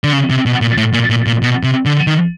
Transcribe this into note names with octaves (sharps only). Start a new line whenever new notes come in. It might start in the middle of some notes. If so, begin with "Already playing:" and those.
D3
C#3
C3
B2
A#2
A2
A#2
A#2
A#2
B2
C3
D3
D#3